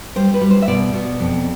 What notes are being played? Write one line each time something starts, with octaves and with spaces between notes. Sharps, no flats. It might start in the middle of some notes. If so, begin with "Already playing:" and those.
G3 C5
B4
G3
C5
E5
B2 D5
B2
F2